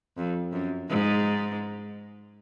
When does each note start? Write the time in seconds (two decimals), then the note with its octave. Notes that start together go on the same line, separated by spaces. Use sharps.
0.17 F2
0.53 F#2
0.89 G#2